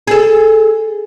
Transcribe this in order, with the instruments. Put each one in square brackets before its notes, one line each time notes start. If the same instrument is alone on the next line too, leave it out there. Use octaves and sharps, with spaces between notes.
[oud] G#4 A4